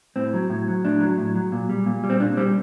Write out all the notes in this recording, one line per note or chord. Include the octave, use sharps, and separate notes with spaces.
A2 C4
F#3
A2
F#3
A2 D4
F#3
A2
F#3
A#2
G3
A#2
G3
C4
A#2 D4
G3 C4